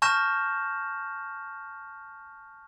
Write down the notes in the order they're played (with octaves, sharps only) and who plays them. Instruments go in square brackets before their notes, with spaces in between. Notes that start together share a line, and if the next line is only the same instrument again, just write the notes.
[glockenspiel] A5 C#6 F6 G6 A#6 E7